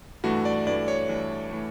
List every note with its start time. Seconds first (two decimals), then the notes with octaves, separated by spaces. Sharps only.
0.24 G2 E3 A3 F#4
0.45 D5
0.67 G2 E3 A3 D5
0.88 C#5
1.09 G2 E3 A3
1.51 E3 A3